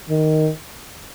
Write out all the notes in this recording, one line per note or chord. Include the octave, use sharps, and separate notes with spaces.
D#3